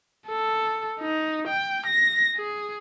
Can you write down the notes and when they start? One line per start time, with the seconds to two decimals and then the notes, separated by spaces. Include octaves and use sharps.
0.28 A4
1.00 D#4
1.48 G5
1.87 A#6
2.36 G#4